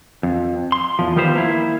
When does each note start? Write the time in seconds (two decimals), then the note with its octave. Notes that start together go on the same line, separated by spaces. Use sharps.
0.23 F2
0.72 C6
0.99 E2 F3
1.16 D#3 F3 G3 B3 G4 C5
1.36 A#3 E4